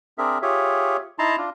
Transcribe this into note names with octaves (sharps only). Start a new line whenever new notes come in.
C4 D4 G#4 A#4 E5
F4 G4 G#4 C#5 E5
D#4 E4 A5 A#5 C6
D4 F4